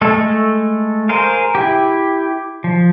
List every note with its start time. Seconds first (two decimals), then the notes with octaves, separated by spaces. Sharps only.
0.01 G#3 A3 A4
1.09 G#4 A#4 C5 F5
1.55 E4 G4
2.64 F3